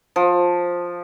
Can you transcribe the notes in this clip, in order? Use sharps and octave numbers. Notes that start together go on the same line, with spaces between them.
F3